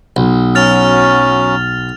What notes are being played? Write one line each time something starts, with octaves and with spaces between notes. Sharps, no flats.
B1
F#3 C#4 F6 A6 F7